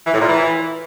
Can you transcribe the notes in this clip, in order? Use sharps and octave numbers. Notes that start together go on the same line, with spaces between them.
E3
A2
A#2
E3